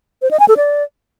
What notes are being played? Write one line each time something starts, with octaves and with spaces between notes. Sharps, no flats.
C5
D#5
G#5
A4
D5